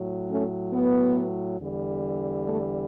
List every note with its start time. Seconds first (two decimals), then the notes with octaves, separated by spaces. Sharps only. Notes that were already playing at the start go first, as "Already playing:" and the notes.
Already playing: A2 F#3
0.29 A3 C#4
0.73 B3
1.60 E2 D3 G3
2.48 A3